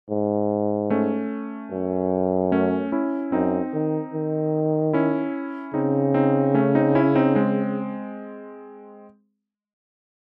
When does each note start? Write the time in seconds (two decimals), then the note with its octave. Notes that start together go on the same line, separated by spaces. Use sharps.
0.10 G#2
0.90 A3 C#4
1.72 F#2
2.52 A3 C#4
2.92 C#4 E4
3.32 F#2 C4 D#4
3.73 D#3
4.14 D#3
4.93 C#4 E4
5.74 C#3 C4 D#4
6.14 C4 D#4
6.54 A3 C#4
6.75 C4 D#4
6.95 C#4 E4
7.15 C4 D#4
7.35 G#3 C4